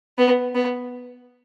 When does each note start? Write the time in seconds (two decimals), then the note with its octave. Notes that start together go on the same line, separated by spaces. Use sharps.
0.18 B3
0.55 B3